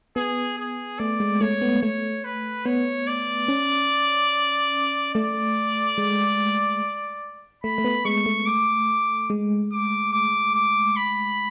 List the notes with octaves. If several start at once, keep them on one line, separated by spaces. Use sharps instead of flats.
B3 G#4
G#4
A3 D5
G#3
A3 C#5
B3
A3 C#5
B4
B3 C#5
D5
C#4
A3 D5
G#3
A3 B5
A3
B3
G#3 C#6
A3
D6
G#3
D6
D6
D6
B5